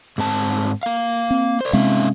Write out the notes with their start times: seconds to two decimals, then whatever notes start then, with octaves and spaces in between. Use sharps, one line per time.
0.18 G#2 C4 A5
0.83 A#3 F5
1.31 C4
1.61 C5 D5
1.73 C3 G#3 C4 C#4 E5 F5